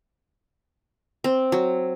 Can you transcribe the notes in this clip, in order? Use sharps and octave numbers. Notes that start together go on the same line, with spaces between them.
C4
F#3